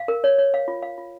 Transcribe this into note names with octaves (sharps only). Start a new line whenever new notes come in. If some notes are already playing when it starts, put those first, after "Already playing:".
Already playing: F5
A#4
C#5
C#5
F5
F4
F5
F4